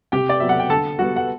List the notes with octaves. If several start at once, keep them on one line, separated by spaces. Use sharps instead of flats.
C3 G4 G5
D5
F#3 B3 E5
F#5
G5
D3 A4 A5
G3 B3 F#4 F#5
F#5